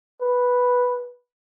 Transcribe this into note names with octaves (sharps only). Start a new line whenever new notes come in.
B4